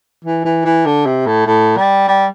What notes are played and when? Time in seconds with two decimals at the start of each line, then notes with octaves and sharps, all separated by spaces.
0.25 E3
0.45 E3
0.65 E3
0.86 D3
1.06 C3
1.26 A2
1.46 A2
1.77 G3
2.07 G3